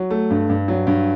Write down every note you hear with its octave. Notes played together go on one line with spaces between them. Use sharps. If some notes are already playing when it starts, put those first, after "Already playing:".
Already playing: F#3
A3
G2
G2
F#3
G2